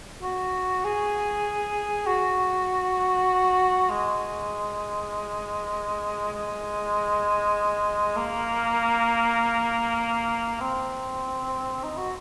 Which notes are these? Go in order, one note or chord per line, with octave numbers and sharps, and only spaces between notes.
F#4
G#4
F#4
G#3
G#3
A#3
C4
D#4
F#4